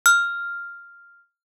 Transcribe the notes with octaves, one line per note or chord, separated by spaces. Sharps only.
F6